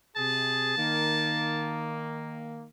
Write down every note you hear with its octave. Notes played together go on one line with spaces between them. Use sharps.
C3 G#4 A5
D#3 A#3